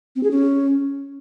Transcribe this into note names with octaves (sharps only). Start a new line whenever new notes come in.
C4
G#4
C#4